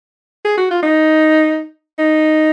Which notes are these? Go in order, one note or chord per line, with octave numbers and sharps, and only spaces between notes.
G#4
F#4
F4
D#4
D#4